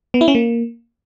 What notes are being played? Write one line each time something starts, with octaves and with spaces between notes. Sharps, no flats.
B3
E4
C#4
A#3